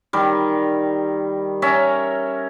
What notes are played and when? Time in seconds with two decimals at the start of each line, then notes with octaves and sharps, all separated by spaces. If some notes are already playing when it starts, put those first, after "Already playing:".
0.13 D#3 G3
1.62 C#4 A#4 E5